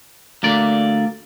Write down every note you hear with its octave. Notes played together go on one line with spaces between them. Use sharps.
D2 A#3 D5